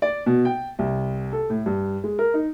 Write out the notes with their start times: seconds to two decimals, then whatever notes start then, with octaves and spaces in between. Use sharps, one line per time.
0.02 D5
0.26 B2
0.45 G5
0.79 C2
1.33 A4
1.50 A2
1.66 G2
2.04 G#3
2.19 A#4
2.34 D#4